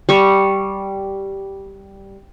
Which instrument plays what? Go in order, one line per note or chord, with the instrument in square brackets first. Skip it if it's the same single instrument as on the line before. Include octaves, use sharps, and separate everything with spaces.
[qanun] G3 C#6